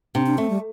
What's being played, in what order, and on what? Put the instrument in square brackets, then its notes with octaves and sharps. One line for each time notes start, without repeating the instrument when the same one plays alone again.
[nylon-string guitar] C3 [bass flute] D4
[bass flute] D4
[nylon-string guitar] A3 [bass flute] C4
[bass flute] G3